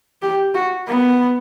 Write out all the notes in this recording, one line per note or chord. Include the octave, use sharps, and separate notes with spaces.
G4
F#4
B3